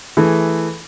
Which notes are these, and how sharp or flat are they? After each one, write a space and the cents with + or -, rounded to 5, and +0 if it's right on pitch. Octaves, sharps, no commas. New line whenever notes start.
E3 +0 A3 +0 G#4 +0